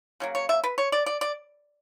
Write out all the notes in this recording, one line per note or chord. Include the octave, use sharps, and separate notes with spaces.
C#3 F#3 A#3
C#5
E5
B4
C#5
D5
D5
D5